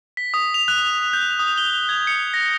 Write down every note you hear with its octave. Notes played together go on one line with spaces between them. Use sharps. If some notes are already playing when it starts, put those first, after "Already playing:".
B6
D#6
F7
F#6
G6
D#6
G7
G#6
C#7
A#6